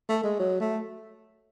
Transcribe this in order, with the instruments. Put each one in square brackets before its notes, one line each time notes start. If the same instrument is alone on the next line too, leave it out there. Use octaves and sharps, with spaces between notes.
[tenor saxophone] A3
G#3
F#3
A3